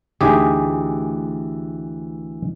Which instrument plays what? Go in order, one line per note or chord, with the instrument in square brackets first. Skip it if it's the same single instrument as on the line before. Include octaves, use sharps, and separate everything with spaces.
[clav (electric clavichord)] D2 G4 G#4 [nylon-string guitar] E3 D#4 E5